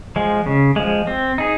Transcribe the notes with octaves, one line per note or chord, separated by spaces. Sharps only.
F3 G#3
C#3
F3 G#3
C4
D#4 G#4